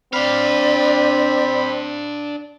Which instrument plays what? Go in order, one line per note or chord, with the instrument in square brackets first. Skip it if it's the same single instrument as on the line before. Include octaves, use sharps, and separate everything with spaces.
[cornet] C4 [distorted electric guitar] D4 F5 [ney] D5 [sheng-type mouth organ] B5